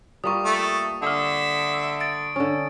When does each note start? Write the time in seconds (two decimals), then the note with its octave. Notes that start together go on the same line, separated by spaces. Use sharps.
0.24 G3 A#3 F4 C#6 D#6
0.45 A3
1.02 D3 E5 D#6 F6
2.00 A6 D7
2.36 D3 C#4